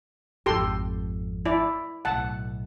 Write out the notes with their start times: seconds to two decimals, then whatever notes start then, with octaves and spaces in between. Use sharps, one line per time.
0.46 G#1 F2 G4 A4 C6
1.46 E4 D5
2.05 B1 A2 F#5 A5